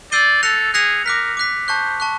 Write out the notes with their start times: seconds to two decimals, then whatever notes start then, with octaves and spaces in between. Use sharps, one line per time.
0.12 D5 E6 G6 C7 D#7 G7
0.43 A4 F#6 A#6 C#7 F7
0.74 G#4 F#6 A#6 C#7 F7
1.05 A#4 D6 F#6 B6
1.37 D6 F#6 B6
1.68 C5 A5 C#6 F#6
2.00 A5 C#6 F#6